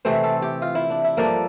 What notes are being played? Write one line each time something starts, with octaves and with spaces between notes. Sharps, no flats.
C3 E3 A3 C4 C5
A4
G4
F4
E4
D4
E4
G2 F3 A#3 D4 A4